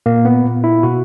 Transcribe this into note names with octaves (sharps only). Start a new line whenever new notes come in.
A#2 A#3
B3
A#2
E4
B2 F#4